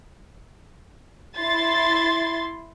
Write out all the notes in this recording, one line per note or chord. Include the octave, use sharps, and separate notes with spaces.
E4 C6 A6